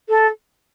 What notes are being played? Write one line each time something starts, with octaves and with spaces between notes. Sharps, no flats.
A4